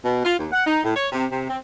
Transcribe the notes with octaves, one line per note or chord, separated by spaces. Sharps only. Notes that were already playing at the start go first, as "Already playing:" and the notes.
B2
F4
D#2
F#5
D#4
A2
C#5
C3
C3
C4